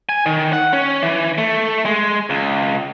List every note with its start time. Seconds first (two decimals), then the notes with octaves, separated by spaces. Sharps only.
0.09 G#5
0.26 D#3
0.53 F#5
0.73 C#4
1.02 E3
1.38 A3
1.85 G#3
2.30 C#2